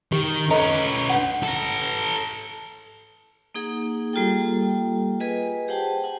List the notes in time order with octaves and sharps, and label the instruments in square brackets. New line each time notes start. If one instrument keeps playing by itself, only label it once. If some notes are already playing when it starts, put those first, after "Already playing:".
[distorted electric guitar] D#3 [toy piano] G4
[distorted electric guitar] C#4 B4 [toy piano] A4 D#5 A#5
[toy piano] F#5
[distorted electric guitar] A4 A#5
[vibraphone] A#3 D#4 G#4 F#5
G3 A#3 F4 G4 A4 G5
G#4 B4 D#5 G#5
G4 C5 F#5 G5 A5
F#5 G#5